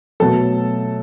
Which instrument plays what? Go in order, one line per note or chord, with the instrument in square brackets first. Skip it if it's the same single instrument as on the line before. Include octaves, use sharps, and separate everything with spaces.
[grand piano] B2 F#3 A3 A4